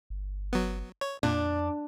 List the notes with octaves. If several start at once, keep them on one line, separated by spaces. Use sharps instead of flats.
G1
F#3 B3
C#5
F2 A#2 D4